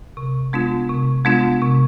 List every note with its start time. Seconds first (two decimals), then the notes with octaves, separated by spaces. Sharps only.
0.17 C3
0.53 G#3 B3 D4 F4
0.89 C3
1.25 G#3 B3 D4 F4
1.62 C3